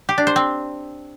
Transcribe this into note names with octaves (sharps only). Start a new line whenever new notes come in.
G4
D4
C5
C4